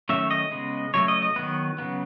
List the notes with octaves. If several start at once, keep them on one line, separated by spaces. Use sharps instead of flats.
D#3 F#3 A3 C#4 E5
D#5
C#3 G#3 B3
C#3 F#3 A3 C#5
D#5
D#5
D#3 F#3 B3 B4
C#3 F#3 B3